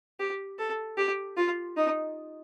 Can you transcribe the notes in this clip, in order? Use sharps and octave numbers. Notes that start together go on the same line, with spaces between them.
G4
A4
G4
F4
D#4